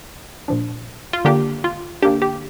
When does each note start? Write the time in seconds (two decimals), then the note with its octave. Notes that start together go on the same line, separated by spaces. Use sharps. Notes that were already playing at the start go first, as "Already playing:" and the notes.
0.48 A#2 F3 D4
1.13 F4
1.25 D3 A#3 D4 G4
1.64 F4
2.03 D3 A#3 D4 G4
2.22 G4